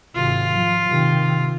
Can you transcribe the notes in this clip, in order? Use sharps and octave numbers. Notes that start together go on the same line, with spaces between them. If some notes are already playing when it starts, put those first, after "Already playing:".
G#1 C3 F4
F3
C3 D#3